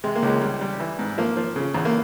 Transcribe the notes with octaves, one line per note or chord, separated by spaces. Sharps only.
C3 G#3
A#3
C#2 G#3
G3
G3
E3
G#2
F3 A#3
F3
C#3
E2
A#3